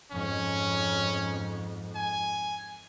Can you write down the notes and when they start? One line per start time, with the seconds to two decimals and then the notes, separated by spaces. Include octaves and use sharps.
0.12 F2 G#2 C#4
1.96 G#5